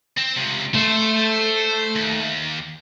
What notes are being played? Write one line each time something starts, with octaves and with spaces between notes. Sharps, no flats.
C4
C#2 C3
A3 C5
D#2